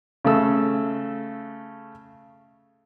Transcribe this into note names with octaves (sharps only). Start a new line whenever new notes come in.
C#3 A3 E6